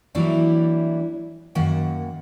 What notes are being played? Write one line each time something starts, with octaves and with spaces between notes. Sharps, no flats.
E3 F#3 G3 A#3 D4 E4
F#2 D#3 A#3 F#5